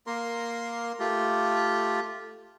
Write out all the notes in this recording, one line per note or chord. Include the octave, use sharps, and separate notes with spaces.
A#3 A#4 C6
A3 F4 G4